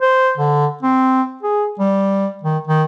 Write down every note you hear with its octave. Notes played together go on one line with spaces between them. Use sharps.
C5
D3
C4
G#4
G3
D#3
D#3